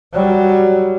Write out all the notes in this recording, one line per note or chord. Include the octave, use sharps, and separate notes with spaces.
F#3 G3